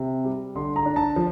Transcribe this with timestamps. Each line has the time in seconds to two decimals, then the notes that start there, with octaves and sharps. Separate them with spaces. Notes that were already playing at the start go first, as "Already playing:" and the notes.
Already playing: C3
0.24 G3
0.55 D3 C6
0.76 A#5
0.86 D4
0.96 A5
1.16 F3